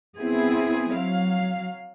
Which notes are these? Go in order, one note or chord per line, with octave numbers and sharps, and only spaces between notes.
B3 C4 E4 G#4
F#3 F5